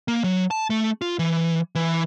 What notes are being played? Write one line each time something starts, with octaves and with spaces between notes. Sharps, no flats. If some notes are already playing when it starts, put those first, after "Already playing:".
A#3
F#3
A5
A3
F4
E3
E3